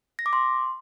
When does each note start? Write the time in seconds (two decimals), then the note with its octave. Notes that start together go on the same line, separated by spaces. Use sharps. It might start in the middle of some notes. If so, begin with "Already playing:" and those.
0.19 A#6
0.26 D6
0.33 C6